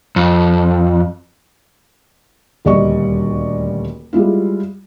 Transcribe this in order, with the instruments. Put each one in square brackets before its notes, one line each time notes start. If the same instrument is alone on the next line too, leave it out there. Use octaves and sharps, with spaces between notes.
[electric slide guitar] F2
[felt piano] D#1 D2 G3 D5 D#5 C#6
G3 G#3 E4 F4